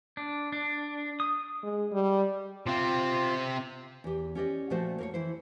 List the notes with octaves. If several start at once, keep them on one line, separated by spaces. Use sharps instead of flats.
D4
D4
D#6
G#3
G3
C3 C4 F4
E2 G4
C#4 G4 D5 D#5
A#2 F3 A3 F#4 C5 F#5
A#3 A#4 C#5
E3 E4 C5